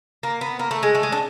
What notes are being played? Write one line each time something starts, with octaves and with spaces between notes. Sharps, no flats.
A#3
B3
A#3
A3
G#3
A3
G#3
D4